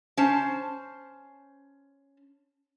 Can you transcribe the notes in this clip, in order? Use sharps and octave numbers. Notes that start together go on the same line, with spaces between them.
C#4 C5 A5